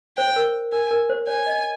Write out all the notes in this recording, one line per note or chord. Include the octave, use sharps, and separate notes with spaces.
C5 G5
C5
A#4
A#4 G#5
A#4
C5
C#5 G#5
D#5